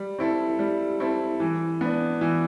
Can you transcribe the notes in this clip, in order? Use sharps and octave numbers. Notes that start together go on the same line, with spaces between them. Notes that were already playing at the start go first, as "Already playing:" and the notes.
Already playing: G3
C4 E4 A4
G3
C4 E4 A4
E3
B3 D4
E3